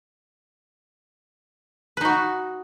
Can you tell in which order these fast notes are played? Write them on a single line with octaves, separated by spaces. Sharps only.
B4 D#4 F#4